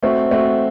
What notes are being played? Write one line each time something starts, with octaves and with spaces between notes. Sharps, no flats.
A3 C4 F#4
A3 C4 F#4